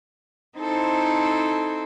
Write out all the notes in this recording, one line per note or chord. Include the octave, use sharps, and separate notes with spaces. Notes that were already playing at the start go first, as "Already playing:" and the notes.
C4 D#4 E4 A4 C5